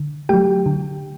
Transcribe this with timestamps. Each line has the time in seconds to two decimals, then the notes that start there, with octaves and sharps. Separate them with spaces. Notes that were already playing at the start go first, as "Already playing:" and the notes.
Already playing: D3
0.29 F#3 A3 G4 G5
0.66 D3